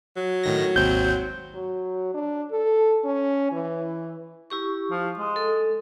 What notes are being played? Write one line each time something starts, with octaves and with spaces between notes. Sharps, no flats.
F#3
A2 D#3 A#6
G#1 D#2 C4 G6
F#3
D4
A4
C#4
E3
E4 G4 C#6
F3
G#3
A4